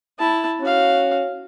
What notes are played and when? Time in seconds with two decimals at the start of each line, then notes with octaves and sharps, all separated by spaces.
0.19 E4 A5
0.61 C#4 F#4 F5